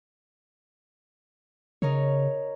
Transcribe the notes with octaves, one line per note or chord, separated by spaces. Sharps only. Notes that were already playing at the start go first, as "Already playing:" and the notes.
C#3 D#4 A#4 C#5